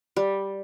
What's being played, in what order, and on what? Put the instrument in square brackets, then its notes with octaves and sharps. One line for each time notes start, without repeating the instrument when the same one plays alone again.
[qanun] G3